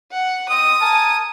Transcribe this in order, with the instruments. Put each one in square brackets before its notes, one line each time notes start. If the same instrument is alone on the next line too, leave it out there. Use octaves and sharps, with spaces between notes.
[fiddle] F#5
[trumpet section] C4 D#5 [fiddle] D#6
[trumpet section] A#4 G#5 A5